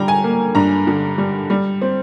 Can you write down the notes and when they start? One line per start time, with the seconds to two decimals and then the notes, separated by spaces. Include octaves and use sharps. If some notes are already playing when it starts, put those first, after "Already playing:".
Already playing: D3 G3 G5 A#5
0.08 G#5
0.24 A#3
0.55 G2 A#5
0.87 D3
1.18 G3
1.50 G3
1.82 C4